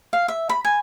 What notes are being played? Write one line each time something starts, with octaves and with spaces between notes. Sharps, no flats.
F5
E5
B5
G#5